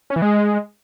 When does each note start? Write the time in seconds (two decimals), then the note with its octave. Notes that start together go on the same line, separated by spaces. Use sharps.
0.10 C#4
0.16 E3
0.22 G#3